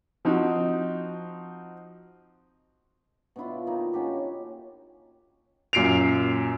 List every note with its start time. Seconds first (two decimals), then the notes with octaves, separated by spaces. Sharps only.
0.25 F3 C4 D#4 F#4
3.36 B2 D4 E4 F4
3.67 D#3 A#3 D#4 A#4
3.93 C#4 F#4 G4 A4
5.73 F#2 A#2 C7 D7 F7